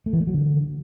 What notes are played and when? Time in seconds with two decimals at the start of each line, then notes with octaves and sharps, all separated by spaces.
0.06 A3
0.13 E3
0.20 A3
0.27 F#3
0.34 D3